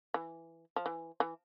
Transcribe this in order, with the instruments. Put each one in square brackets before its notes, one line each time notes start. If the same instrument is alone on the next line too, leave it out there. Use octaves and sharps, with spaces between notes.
[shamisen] E3
F3
E3
E3